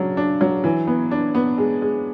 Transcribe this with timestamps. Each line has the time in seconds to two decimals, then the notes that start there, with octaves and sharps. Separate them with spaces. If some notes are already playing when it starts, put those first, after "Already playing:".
Already playing: C#3 F#3 D4
0.17 D4
0.41 F#3
0.64 E3
0.87 B3
1.11 D4
1.35 B3
1.58 G#3
1.82 G#3